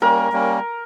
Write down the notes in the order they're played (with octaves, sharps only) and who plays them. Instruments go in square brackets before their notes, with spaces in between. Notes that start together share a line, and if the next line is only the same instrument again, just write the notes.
[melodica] G3 A#3 C#4 [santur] A#4
[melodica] G3 A#3 C#4